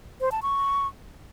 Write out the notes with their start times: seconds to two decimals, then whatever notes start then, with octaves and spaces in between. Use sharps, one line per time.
0.21 C5
0.32 A5
0.42 C#6